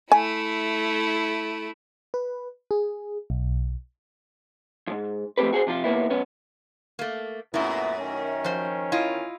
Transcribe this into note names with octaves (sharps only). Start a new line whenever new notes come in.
A3 E4 G#5
B4
G#4
B1
F2 G#2
F3 A3 C4 G4 B4
F#4 G#4 A4 C5
C3 F3 F4
D#2 A#3 B3 E4
F#2 B3 C#4
A3 A#3
F#2 A#2 A3 B3 E4
D#3 C#4
F3 C5
E4 F4 D#5